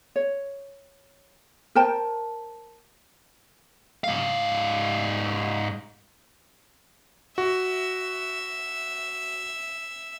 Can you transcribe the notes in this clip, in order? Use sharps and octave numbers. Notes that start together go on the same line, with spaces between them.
C#5
A#4 C5 G5 A5
G#2 F5
F#4 E5